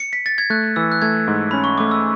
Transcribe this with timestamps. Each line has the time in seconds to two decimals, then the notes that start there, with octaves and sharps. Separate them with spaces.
0.00 C#7
0.13 B6
0.26 A6
0.38 G#6
0.50 A3 F#6
0.76 E3 E6
0.92 F#6
1.02 A3 G#6
1.28 G#2
1.51 C#4 B5
1.64 C#6
1.78 A3 D6
1.91 E6